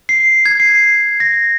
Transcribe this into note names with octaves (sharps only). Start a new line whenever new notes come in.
C7
G#6
C7
A#6